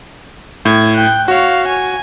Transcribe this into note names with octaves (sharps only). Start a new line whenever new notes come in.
A2 G#6
G5 F#6
F#4 C#5 F5
G#5